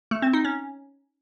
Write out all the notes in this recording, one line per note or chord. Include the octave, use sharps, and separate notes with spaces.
A3
C4
D#4
C#4